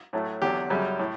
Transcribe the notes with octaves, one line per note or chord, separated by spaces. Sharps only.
A2 F#3 A3
E2 D3 F#3 G4
F#2 C#3 G3
A2